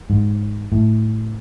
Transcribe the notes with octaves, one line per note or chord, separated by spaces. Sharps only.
G#2
A2